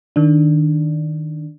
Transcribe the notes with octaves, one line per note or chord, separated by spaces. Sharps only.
D#3 D4